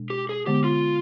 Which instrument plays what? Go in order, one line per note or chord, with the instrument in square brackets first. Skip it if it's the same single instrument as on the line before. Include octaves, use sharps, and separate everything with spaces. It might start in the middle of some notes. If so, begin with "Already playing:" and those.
Already playing: [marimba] B2 G#3 D4
[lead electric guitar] G4
G#4
[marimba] D3 G#3 B3 [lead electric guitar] G4
[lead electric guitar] F4